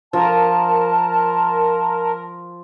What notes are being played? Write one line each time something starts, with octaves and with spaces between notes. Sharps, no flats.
F3 A#4 A5